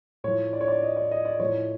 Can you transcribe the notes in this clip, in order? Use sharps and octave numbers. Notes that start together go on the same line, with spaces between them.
A2 F3 C#5
D5
C#5
D5
D#5
D5
D#5
D5
A2 F3 C#5